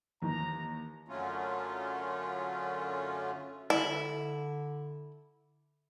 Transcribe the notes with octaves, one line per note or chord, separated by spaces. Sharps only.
D#2 D#3 E3 A#5
F#2 D3 F#3 A3 C#4 F4
D3 E4